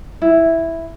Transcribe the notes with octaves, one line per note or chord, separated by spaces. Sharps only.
E4